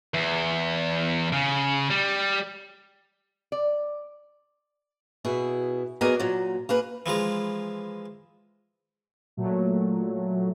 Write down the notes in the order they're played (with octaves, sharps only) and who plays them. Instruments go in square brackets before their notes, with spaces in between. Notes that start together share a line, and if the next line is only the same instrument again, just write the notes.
[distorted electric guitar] E2
C#3
G3
[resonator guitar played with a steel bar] D5
[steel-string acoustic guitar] B2 E4 G#4
F#3 B3 G#4 A#4 D5 D#5
A#2 F#3
A#3 G#4 B4
[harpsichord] E3 F3 G#3 A#5
[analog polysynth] A#2 F#3 A3